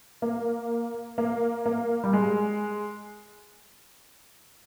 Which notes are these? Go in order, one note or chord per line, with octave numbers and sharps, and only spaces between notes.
A#3
A#3
A#3
G3
G#3